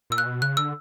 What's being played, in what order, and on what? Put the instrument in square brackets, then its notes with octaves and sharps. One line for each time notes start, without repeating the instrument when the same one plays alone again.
[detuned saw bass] A#2 [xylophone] E6
[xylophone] F#6
[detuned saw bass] B2
[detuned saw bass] C#3 [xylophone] F#6
[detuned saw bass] D3 [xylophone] E6